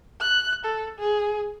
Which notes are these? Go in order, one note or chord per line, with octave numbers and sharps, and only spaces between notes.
F#6
A4
G#4